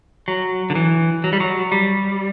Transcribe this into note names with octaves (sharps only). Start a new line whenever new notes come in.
F#3
D3
E3
F#3
G3
F#3
G3